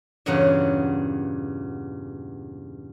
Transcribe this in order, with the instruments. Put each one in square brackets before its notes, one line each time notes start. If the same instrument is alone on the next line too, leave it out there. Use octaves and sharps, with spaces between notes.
[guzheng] E2 G2 A#2 C#3 A#4 F#5